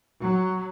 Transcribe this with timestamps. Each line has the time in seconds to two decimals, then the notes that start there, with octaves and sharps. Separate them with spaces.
0.21 F#3